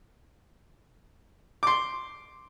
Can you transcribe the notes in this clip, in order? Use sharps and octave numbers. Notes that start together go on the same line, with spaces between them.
C6 D6